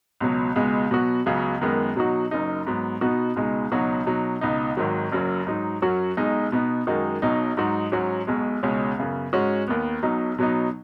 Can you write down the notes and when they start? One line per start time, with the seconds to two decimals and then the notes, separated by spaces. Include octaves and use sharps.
0.21 C#2 B2 F#3 B3
0.56 C#2 B2 G#3 B3
0.91 B2 F#3 B3 F#4
1.26 C#2 C#3 F#3 B3
1.61 F#2 D#3 G#3 B3
1.96 B2 F#3 D#4 F#4
2.31 F#1 F#2 F#3 D#4
2.67 G#2 F#3 B3
3.01 B2 B3 D#4 F#4
3.36 C#2 B2 G#3 D#4
3.72 C#2 B2 F#3 D#4 F#4
4.06 B2 F#3 D#4
4.41 C#2 B2 B3 D#4
4.77 G#1 G#2 D#3 F#3
5.12 F#1 F#2 F#3
5.47 G#2 F#3 D#4
5.82 F#2 F#3 C#4 F#4
6.17 B1 B2 G#3 D#4
6.52 B2 B3 D#4
6.87 F#2 D#3 G#3 D#4 F#4
7.22 B1 B2 F#3 D#4
7.57 G#2 F#3 D#4 F#4
7.92 G#2 F#3 C#4 F#4
8.27 B1 B2 G#3
8.63 C#2 B2 G#3 C#4
8.98 F#2 C#3 B3
9.33 G#2 G#3 C#4 F#4
9.68 D#2 D#3 B3
10.03 B1 B2 F#3 D#4
10.39 B2 F#3 B3 D#4